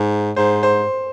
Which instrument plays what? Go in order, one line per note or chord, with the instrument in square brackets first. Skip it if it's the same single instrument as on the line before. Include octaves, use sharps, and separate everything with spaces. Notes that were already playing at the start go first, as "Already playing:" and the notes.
Already playing: [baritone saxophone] G#2
[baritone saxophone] G#2 [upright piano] C5
[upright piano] C5